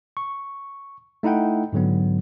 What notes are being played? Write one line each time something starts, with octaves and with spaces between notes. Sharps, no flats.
C#6
A3 D#4 E4 F#5 G5
G#2 D3 F#3 B3